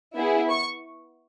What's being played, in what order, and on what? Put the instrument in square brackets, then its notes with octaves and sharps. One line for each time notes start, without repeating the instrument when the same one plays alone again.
[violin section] B3 E4 G#4
C#6